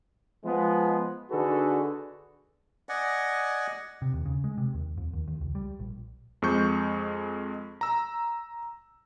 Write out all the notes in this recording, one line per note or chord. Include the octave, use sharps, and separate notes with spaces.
F3 G#3 B3
D3 D#4 F#4 G#4 A4 B4
D5 D#5 F#5 G#5
C3
D#2
C#3
G#3
C3
D#2
F2
D#2
D#2
C#2
G3
A#1
F2 G#3 C#6 G6
A#5 E6